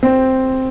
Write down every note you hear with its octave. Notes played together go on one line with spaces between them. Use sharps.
C4